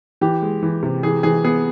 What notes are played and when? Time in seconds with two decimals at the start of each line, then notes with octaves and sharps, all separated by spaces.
0.21 E3 G4
0.42 G#3
0.63 E3
0.83 C3
1.03 E3 G#4
1.23 E3 G#4
1.44 B3 G#4